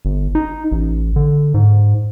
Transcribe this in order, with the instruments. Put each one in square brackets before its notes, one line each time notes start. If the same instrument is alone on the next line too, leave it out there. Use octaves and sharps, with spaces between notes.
[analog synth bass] G1
D#4
A1
D3
G#2